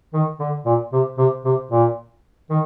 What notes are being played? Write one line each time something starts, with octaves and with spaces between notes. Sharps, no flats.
D#3
D3
A#2
C3
C3
C3
A#2
D#3